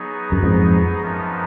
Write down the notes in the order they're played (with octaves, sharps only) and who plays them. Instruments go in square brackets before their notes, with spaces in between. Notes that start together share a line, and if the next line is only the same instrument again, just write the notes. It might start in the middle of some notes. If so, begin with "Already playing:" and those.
Already playing: [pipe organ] F#3 B3 D#4 G#4
[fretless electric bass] F#2
F2 G#2
[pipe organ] F#2 F3 B3 D#4